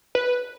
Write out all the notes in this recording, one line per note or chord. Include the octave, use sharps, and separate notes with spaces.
B4